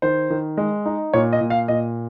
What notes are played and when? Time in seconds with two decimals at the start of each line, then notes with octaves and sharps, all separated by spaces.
0.02 D#3 C5
0.30 D#3
0.57 G#3
0.86 D#4
1.14 A#2 C#5
1.33 D#5
1.41 A#2
1.50 F5
1.68 A#2 D#5